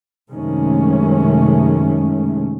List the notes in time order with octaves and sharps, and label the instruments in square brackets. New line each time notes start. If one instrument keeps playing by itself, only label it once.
[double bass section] F#2 C3 D#3 G#3 A3 C#4